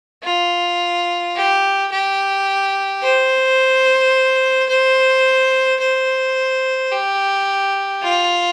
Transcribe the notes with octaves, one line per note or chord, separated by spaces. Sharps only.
F4
G4
G4
C5
C5
C5
G4
F4